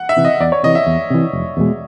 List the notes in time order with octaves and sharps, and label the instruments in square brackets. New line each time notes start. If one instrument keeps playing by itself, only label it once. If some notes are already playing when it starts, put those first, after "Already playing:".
Already playing: [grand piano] F#5
E5
[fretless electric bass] C3 E3
[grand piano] D#5
[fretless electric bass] E2 [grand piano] D5
[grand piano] C#5
[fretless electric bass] C3 E3 [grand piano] D#5
[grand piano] E5
[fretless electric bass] E2
C3 E3
F1
E2 B2 G#3